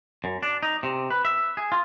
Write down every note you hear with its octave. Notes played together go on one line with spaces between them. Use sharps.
F#2
D4
D#4
C3
B4
E5
G#4
F4